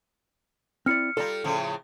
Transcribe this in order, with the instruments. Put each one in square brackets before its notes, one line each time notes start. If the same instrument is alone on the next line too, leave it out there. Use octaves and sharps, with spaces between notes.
[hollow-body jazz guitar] C4 E4 D5 [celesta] F6 C#7
[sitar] G3 F4 [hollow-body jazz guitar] A4 D5 A#5
[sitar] A2 C#3 F3